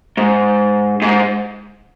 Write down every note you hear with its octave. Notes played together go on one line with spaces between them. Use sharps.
G#2
G#2